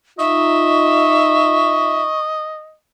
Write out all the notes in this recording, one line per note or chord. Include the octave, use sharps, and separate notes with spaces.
D#4 F4 D#5 E5 C#6